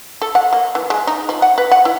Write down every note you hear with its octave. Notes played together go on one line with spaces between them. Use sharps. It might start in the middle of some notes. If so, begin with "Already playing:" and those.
A4
F#5
A#3
E3
G#3
D#4
F3
F#5
B4
F#5
E4